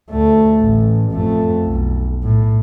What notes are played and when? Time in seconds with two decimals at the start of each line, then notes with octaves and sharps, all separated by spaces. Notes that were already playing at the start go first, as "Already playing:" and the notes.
0.10 D2 A3
0.61 A1
1.12 F2 A3
1.65 B1
2.24 A2